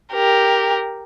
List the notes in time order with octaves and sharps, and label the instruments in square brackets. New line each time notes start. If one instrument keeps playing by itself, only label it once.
[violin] G4 A#4